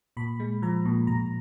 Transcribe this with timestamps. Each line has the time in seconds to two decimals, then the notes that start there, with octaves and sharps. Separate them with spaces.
0.17 A#2 B5
0.40 G#3
0.62 F3 A#5
0.85 A#2
1.07 A#2 A#5